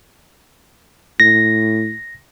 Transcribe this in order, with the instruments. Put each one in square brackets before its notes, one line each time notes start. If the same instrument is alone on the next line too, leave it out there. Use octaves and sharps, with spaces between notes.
[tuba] A2 [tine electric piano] A#6